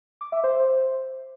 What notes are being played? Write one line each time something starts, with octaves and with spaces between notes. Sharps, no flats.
D6
E5
C5